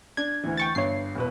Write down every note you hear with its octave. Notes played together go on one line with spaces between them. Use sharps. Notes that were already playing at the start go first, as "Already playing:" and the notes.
D4 G#6
D2 E3
G5 C#6 A6
G1 G2 C#5 C7
E1 B2 B4